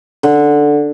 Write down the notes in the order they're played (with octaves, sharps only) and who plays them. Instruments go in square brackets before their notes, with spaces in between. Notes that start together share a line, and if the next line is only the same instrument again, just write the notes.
[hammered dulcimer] D3